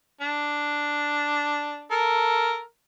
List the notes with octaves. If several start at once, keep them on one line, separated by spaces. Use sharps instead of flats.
D4
A4 A#4